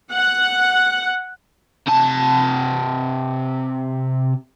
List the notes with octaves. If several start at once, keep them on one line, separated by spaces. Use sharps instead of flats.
F#5
C3 A5